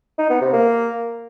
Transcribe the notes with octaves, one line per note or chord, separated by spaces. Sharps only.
D#4
B3
C3
A#3